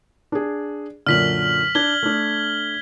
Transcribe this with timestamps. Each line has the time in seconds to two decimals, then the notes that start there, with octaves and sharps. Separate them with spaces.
0.32 D4 G#4
1.07 F#2 A#2 D3 F6 B6 F#7
1.75 D4 G#6 G7
2.03 A3 D4